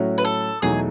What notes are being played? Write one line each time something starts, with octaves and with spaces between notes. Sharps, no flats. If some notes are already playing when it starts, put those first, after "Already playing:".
Already playing: A2 F#3 C#4 F#4
B4
A4
E2 B2 F#3 A3 D#4 G#4